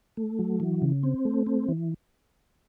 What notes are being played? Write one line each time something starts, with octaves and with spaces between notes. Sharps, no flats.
A3
F#3
E3
C#3
C4
A3
C4
E3